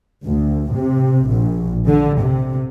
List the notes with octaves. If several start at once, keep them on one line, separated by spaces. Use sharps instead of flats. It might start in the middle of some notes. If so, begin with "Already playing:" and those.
D2
C3
A#1
D3
C3